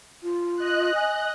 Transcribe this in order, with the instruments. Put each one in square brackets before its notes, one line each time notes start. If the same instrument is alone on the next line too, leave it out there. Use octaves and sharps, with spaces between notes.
[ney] F4
[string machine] D#5 F#6
[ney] G#5